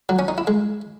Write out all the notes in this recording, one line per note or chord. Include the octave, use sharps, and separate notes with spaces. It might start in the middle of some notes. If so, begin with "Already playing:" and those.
F#3
C#4
D#4
E4
G#3